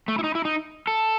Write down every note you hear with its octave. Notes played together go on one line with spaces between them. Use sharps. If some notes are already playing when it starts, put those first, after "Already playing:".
A3
E4
D#4
E4
D#4
A4